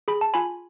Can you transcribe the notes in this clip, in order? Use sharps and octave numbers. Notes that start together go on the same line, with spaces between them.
G#4 B5
A5
F4 G#5 B5